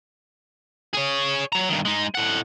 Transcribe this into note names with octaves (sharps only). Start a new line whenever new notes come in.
G#4 C#5
F#3 A#5
G2 D#3
G#3 D#4
A2 F#5